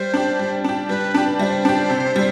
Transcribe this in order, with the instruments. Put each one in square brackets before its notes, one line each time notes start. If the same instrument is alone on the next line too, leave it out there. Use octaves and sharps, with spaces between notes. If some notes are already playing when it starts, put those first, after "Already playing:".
Already playing: [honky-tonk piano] G3 [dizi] C5
[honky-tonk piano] D4 G4
G3
D4 G4
[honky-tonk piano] G3 [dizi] B4
[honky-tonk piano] D4 G4
[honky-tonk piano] G3 [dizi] E5
[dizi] C5
[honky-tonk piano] D4 G4
C3
G3